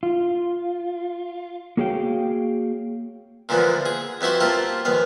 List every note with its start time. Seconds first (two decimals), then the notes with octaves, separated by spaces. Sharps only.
0.03 F4
1.77 A#3 F#4 G#4 C#5 F5 G5
3.49 A#2 D3 E3 F3 B3
3.86 G#4
4.21 F2 B3 E4 F#4 C5
4.40 A#3 C4 F4 G4 A5
4.85 A#1 D#2 B3 F5